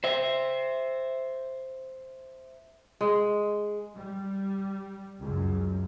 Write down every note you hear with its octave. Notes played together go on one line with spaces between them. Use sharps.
C5 E5
G#3
G3
C#2 F#2